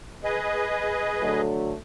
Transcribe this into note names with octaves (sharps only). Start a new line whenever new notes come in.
G#4 B4 D#5
D3 F#3 A3